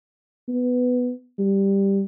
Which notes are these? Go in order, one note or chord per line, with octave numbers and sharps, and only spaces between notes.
B3
G3